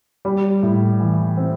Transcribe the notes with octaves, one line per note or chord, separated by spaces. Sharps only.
G3
A2
E3
C4